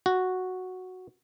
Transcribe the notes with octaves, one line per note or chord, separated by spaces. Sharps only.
F#4